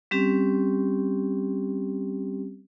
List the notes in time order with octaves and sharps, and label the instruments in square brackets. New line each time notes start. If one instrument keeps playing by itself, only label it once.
[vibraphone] G3 C4 C#4 G4